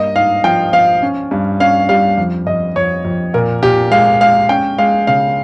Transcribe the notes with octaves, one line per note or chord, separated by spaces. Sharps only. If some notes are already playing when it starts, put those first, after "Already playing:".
Already playing: G2 A#3 D#5
G#2 F5
F3 G5
F3 F5
C#4
G2
C#4 F5
G3 F5
F2
F2 D#5
F2 C#5
F2
A#2 A#4
A#2 G4
G#3 F5
G#3 F5
C#4 G5
G#3 F5
C#3 F5